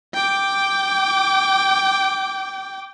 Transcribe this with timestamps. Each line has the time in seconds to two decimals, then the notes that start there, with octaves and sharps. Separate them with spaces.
0.14 G5 D6